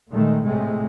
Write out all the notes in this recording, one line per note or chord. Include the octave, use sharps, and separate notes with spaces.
A#2 D#3 G#3 A3
A2 C3 G#3 A3